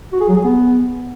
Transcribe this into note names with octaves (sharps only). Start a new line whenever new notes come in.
F#4
G#4
F#3
G#4
B3